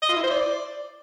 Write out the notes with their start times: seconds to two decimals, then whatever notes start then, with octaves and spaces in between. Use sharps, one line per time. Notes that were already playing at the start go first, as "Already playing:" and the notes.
0.02 D#5
0.09 F4
0.16 E4
0.23 C5
0.30 D5